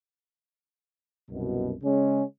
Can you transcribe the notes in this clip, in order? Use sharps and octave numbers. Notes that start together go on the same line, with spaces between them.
C2 F#2 B2
C#3 G#3 C#4